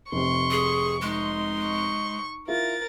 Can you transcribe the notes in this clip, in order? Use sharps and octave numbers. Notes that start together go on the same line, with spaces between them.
F1 C3 C6 C#6
G#4
G#3 D#4 C6
C#6
E4 F4 A#4 A6